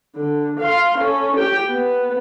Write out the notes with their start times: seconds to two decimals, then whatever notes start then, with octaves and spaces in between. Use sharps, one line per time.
0.16 D3
0.60 F5 C6
0.98 C#4 A4
1.37 G4 G5
1.69 B3